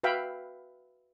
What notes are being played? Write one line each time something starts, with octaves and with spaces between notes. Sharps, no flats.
F#4 B4 E5 F5 G5 B5